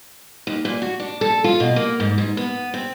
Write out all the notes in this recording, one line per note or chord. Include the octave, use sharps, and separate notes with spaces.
D#2
A#2
F#4
D4
A4
F4
B2
A#3
G#2
G#2
B3
C4